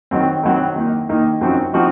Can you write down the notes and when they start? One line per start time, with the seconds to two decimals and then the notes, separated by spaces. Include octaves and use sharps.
0.11 D#3 F#3 C4
0.43 D#3 F#3 C4
0.76 D#3 A#3 D#4
1.09 D#3 A#3 D#4
1.41 F#2 F3 C4 D#4 F#4
1.73 F3 C4 D#4 F#4